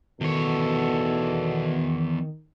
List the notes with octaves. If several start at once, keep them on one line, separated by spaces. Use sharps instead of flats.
E2 B2 D#3 A4 C#5